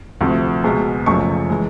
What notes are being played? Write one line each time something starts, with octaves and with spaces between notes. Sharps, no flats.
D2 C3 F3 A3
C#2 B2 G#3
F#1 F#2 C#3 F3 A3 C#6
E3 G#3